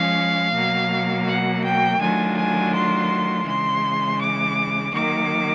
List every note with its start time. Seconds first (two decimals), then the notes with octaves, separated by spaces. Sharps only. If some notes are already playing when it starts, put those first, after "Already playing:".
Already playing: F3 G#3 C#4 F5
0.53 B2 F#3 A#3
1.26 F#5
1.63 G5
1.99 D#3 F#3 A3 D4 F4 G#5
2.37 G#5
2.73 C6
3.46 C#3 E3 G#3 C6
4.21 D6
4.94 D#3 F#3 A#3 D6